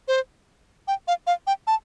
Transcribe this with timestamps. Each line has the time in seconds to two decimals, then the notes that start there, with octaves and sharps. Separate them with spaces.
0.08 C5
0.88 G5
1.08 F5
1.27 F5
1.47 G5
1.67 A5